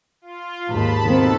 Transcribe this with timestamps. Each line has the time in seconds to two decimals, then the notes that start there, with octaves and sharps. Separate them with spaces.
0.22 F4
0.67 D#2 G#2 A5 B5
1.05 B2 D#3 C4 A4 A5